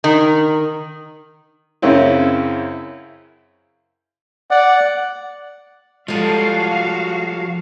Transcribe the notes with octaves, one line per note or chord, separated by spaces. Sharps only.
D#3
F#2 C#3 C4 C#4 E4
D5 F#5
F3 G3 G#3 F#4 A4 F5